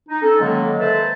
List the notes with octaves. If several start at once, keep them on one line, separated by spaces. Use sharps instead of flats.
D#4
C#4 A4
D3 D#3 F#3 G#3 A#3
A4 B4 C5 E5 A5